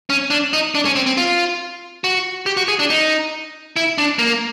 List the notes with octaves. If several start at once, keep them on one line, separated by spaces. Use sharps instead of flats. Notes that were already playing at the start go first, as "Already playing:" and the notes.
C#4
D4
D#4
D4
C#4
C4
C4
F4
F#4
G4
F#4
G#4
D4
D#4
E4
D4
A#3